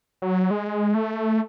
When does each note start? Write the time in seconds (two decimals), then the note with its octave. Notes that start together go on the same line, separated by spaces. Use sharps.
0.22 F#3
0.51 G#3
0.95 A3